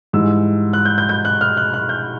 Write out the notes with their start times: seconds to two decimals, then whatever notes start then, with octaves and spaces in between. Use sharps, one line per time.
0.13 G#2 E3 G3 E6
0.73 F#6
0.85 G6
0.98 G6
1.09 G6
1.25 F#6
1.41 F6
1.57 F#6
1.74 F#6
1.89 G6